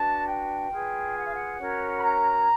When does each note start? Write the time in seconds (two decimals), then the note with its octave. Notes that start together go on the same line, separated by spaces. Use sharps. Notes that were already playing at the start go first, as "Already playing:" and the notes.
Already playing: D4 F#4 B4 A5
0.26 G5
0.70 F4 G#4 B4
1.15 F#5
1.24 F5
1.34 F#5
1.58 C#4 F#4 A#4 C#5
1.97 B5
2.02 A#5